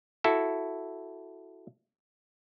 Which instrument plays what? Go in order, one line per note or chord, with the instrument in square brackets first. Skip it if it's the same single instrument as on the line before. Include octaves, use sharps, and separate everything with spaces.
[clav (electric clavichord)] E4 F#4 A4